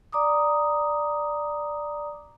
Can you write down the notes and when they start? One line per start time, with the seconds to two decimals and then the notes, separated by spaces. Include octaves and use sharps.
0.12 D5 A#5 D6 D#6